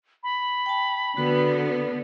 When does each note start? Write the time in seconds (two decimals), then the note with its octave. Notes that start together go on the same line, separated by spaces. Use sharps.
0.23 B5
0.66 G5 A5
1.17 D3 B3 F#4 B4